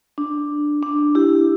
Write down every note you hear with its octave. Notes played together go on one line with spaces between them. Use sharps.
D4
D4
E4 G4